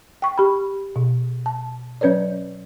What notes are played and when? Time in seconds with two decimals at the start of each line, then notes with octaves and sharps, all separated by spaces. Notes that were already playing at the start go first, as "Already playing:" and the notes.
0.22 G5 C#6
0.38 G4 B5
0.96 B2
1.46 A5
2.01 F#3 C#4 B4 C#5 D5